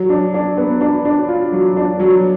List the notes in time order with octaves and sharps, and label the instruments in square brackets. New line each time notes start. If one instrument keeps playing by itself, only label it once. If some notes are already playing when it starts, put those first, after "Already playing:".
Already playing: [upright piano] F#3
D4
D4
B3
D4
D4
F4
F#3
D4
F#3